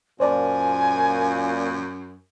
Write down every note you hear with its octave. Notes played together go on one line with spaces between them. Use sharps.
F#2 A#2 C5 D5 G#5 A5